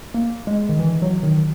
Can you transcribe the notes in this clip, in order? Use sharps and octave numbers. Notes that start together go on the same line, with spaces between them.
A#3
G#3
D#3
E3
F#3
D#3